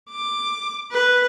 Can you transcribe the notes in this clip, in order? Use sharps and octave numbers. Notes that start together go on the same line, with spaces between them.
D6
B4